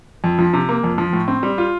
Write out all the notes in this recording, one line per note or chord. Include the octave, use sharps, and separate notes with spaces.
F2
F3
C3
A#3
F2
F3
A2
C4
G3
F4